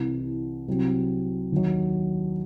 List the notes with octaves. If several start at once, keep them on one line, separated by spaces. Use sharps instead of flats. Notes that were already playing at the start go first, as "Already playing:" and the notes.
Already playing: C2 C3 E3
C2 C3 F#3 C4 F#4
D#2 D#3 F#3